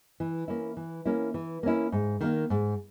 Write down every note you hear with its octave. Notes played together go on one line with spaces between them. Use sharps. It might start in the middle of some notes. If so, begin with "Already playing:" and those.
E3
A#3 C#4 E4
E3
A#3 C#4 E4
E3
A#3 C#4 E4
G#2
D#3 A#3
G#2